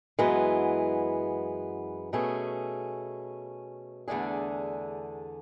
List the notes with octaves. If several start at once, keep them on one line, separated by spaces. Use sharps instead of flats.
F#2 E3 G#3 B3
B2 A3 C#4 G#4
E2 D3 A3 D4 G#4